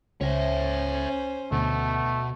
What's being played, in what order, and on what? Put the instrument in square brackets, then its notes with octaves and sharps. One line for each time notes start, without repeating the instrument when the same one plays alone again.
[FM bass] C#2 [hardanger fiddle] C#4 C5 [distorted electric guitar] C#5 E5
[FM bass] D2 [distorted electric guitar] B2 [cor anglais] A3